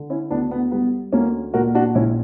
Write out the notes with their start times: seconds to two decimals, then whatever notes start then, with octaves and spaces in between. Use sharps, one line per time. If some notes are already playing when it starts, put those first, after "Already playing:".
Already playing: D3
0.10 C#4 E4
0.31 D2 B3 D4
0.51 B3
0.72 G3 B3
1.12 D2 A#3 C#4
1.54 A#2 F#4 A#4
1.75 D4 F#4
1.95 A#1 C#4 E4